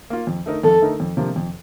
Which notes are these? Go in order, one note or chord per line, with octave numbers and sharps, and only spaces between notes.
A#3 F4
F2
D3 A3 D#4 A#4
F2 A4
D3 A3 D#4 A#4
F2
C3 F3 A#3 D4
F2